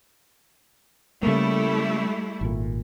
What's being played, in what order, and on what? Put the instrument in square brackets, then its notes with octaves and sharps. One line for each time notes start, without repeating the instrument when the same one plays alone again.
[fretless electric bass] C#3 A#3 [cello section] G3 A3 E4
[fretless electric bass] G#1 A#2